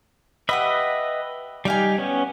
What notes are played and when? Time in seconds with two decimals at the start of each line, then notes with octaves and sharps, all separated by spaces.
0.49 G4 B4 D#5 E5 F#5 B5
1.65 G3 D#4 G4 D5 F5 G#5
1.98 B3 C#4